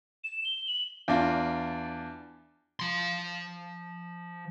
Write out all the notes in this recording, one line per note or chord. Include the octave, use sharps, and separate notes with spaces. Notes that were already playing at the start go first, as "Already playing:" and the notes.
E7
G7
F#7
E2 D4 F4
F3 C6